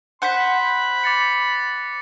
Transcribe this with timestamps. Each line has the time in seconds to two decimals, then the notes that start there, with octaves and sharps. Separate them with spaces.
0.22 C5 F#5 B5 F#6 B6
1.03 D6 A6 C#7